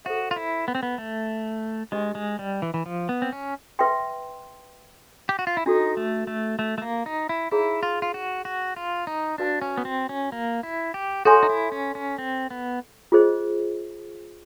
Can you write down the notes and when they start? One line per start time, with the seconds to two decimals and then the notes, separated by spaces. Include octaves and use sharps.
0.05 F#4 A4 C5 E5
0.31 F4
0.36 E4
0.68 B3
0.75 C4
0.83 B3
0.98 A3
1.92 G#3 D4 G4 B4 D#5
2.15 G#3
2.39 G3
2.62 E3
2.74 E3
2.86 F3
3.09 B3
3.22 C4
3.32 C#4
3.79 B4 E5 G5 C6
5.29 G4
5.39 F#4
5.47 F4
5.57 E4
5.66 D4 D#4 F#4 A4
5.97 A3
6.27 A3
6.59 A3
6.78 A3
6.82 A#3
7.06 D#4
7.29 E4
7.52 D#4 E4 G#4 C#5 F5 A#5
7.83 F4
8.02 F4
8.14 F#4
8.45 F#4
8.76 F4
9.07 D#4
9.38 D4 F#4 B4 D5 F5 A5
9.62 C#4
9.77 B3
9.85 C4
10.09 C#4
10.32 A#3
10.63 E4
10.94 G4
11.25 F#4 A4 C#5 E5 G#5 C6
11.43 D#4
11.49 E4
11.72 C#4
11.95 C#4
12.18 C4
12.51 B3
13.12 F4 G#4 C5 D#5